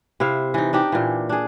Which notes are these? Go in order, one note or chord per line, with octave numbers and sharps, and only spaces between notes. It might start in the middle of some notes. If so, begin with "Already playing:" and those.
C3 E4 C5 F5
E3 D#4
D4 D#4 G4
A#2 E3
D4 G#4